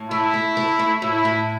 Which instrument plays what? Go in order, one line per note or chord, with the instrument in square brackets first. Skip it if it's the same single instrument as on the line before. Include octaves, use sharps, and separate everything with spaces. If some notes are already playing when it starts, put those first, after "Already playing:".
Already playing: [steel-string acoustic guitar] A2
[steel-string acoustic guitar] A3 [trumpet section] E4
[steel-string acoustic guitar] A3
A3
A3
[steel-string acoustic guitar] A2 [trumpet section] E4
[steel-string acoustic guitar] A2